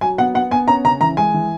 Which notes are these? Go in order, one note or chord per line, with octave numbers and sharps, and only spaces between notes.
F#3 G#5
B3 F#5
B3 F#5
B3 G#5
C#4 A#5
C#3 A#5
E3 A#5
G#3 G#5
E3